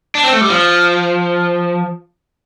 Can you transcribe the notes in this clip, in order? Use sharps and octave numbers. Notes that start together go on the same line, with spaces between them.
D4
C4
A3
G3
F3